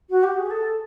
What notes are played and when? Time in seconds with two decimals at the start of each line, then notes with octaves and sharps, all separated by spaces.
0.10 F#4
0.23 G4
0.37 G#4
0.50 A4